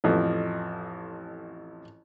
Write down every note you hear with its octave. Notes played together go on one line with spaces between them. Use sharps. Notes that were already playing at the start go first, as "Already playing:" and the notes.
A1 F2